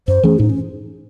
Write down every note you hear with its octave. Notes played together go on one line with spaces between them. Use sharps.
F#2 C5
E3 A3 C#4 G#4
A2 D#4
C#4